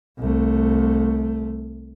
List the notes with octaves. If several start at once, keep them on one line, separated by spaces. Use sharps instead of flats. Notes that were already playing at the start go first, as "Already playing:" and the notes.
C2 A3